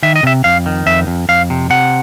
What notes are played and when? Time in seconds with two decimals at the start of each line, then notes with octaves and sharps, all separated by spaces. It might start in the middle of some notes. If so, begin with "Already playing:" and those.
0.03 D#3 E5
0.16 D#5
0.23 C3 E5
0.44 F2 F5
0.66 D#3
0.86 F2 E5
1.07 F2
1.29 F2 F5
1.50 C3
1.70 C3 F#5